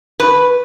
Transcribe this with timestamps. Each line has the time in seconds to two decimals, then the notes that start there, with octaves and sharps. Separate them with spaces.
0.20 B4